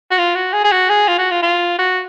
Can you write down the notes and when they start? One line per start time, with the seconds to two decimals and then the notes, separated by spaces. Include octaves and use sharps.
0.11 F#4
0.18 F4
0.35 F#4
0.53 G#4
0.64 G#4
0.72 F#4
0.90 G#4
1.08 F4
1.18 F#4
1.31 F4
1.43 F4
1.79 F#4